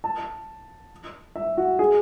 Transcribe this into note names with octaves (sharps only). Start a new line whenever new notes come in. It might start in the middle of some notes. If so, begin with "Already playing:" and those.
A5
E5
F#4
G#4